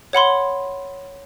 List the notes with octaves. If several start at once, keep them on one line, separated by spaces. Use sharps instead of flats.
C#5 F#5 B5 C6